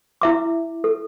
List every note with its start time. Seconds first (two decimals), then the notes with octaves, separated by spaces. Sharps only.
0.22 E4 E5 D6
0.84 A4